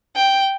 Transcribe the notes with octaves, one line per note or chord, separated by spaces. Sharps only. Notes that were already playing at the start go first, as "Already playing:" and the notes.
G5